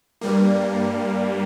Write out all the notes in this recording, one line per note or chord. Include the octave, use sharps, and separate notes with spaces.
G2 G3 A#3